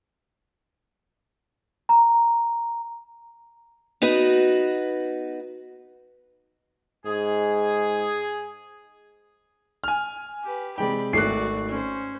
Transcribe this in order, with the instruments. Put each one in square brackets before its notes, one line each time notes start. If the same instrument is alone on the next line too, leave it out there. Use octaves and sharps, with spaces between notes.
[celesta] A#5
[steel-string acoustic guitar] B3 D#4 F#4 B4
[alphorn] G#2 [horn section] G#4
[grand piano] G#5 F6
[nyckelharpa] G4 B4
[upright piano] C3 G#3 G5 [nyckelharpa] D5 B5
[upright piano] G#1 A3 F#6 [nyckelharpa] F#4 D5 [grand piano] C7
[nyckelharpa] C#4 C5